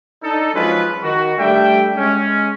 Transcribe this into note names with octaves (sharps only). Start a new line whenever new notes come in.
D4 D#4 A4
F3 F#3 G#3 C#4 F4 B4
D#3 F#4
G3 A3 D4 E5 G5
G#3 C#4